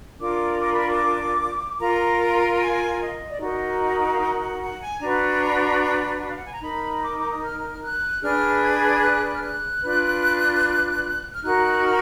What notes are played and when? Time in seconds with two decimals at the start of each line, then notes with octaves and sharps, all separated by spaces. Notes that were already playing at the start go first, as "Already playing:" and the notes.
0.19 D4 F4 A#4 D6
0.59 D6
0.73 B5
0.87 D6
1.80 F4 A#4 A#5
2.60 G#5
3.00 D#5
3.30 D5
3.40 D#4 F#4 A#4 D#5
4.03 D#5
4.12 F5
4.21 F#5
4.41 F#5
4.61 F#5
4.81 G#5
5.00 D4 F#4 B4 A#5
6.28 F5
6.36 F#5
6.45 G#5
6.52 A#5
6.61 D#4 A#4 B5
6.97 B5
7.01 D6
7.19 D6
7.30 D#6
7.42 F6
7.82 F#6
8.22 D4 G#4 B4 F6
8.62 G#6
9.03 F#6
9.34 F6
9.43 F#6
9.82 D4 F4 B4
11.32 F6
11.43 D#4 F#4 A#4 F#6
11.83 F6